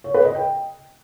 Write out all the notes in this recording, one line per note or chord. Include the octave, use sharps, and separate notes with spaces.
C#5
B4
D#5
G5